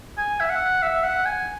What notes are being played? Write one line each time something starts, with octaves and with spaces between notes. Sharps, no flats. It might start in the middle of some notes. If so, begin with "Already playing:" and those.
G#5
E5
F#5
E5
F#5
G#5